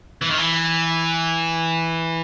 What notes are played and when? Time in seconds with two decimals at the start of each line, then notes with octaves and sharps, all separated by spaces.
0.22 E3
0.30 D#3
0.38 E3